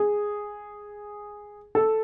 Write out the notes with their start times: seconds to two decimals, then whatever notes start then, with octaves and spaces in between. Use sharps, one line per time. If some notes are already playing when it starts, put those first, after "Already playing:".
Already playing: G#4
1.75 A4